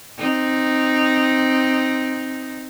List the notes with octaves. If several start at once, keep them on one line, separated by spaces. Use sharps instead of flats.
C4 D#4